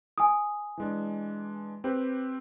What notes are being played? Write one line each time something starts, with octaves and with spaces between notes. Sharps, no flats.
G#5 D#6
E3 G#3 D4
C4 G4 B4